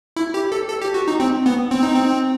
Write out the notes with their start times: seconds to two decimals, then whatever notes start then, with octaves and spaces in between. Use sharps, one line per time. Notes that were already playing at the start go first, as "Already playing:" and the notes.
0.16 E4
0.34 G4
0.52 A4
0.68 A4
0.82 G4
0.94 F#4
1.08 D#4
1.20 C4
1.46 B3
1.71 C4
1.83 D#4
1.94 C4